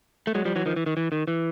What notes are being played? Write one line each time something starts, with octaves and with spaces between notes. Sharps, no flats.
A3
F#3 G#3
F3 G3
E3 F#3
D#3 F3
E3
D#3
E3
D#3
E3